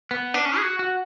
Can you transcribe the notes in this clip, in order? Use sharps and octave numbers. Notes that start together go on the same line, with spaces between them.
B3
D4
C#4
G#4
F#4
F#4